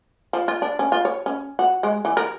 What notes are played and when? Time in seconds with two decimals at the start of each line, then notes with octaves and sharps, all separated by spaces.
0.33 F3
0.48 F4
0.62 D4
0.79 C#4
0.92 F4
1.05 C#5
1.26 C#4
1.59 F#4
1.83 G#3
2.05 E3
2.17 A#4